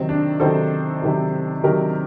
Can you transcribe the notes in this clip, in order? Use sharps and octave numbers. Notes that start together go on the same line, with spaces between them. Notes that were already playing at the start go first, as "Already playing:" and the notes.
Already playing: C3 D#3 F#3 C4
D4
C3 D#3 F#3 A4 C5
C3 D#3 F#3
C3 D#3 F#3 G4 A#4